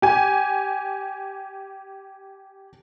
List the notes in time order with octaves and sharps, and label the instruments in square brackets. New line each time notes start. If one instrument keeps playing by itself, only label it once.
[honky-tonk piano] G4 G#5